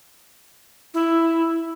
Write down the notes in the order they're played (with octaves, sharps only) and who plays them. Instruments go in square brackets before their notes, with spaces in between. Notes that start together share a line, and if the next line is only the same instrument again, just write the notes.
[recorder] E4